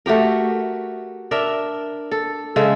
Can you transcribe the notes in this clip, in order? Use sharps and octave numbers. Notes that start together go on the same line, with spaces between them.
A3 F#4 G4 A#4
D4 A#4 E5
A4
C#3 G#3 A4 E5